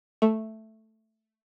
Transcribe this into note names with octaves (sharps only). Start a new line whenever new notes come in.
A3